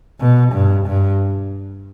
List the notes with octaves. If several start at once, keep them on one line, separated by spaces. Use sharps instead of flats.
B2
G2
G2